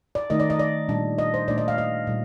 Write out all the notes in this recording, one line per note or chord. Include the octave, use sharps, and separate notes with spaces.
D5
D#3 A3 D#4 D#5
D5
D#5
D5
A#2 G3 D4
D#5
C5
A#2 A3 D4 D5
D#5
F5
D#5
A#2 G3